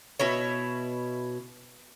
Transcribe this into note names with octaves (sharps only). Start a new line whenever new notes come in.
B2 E4 C#5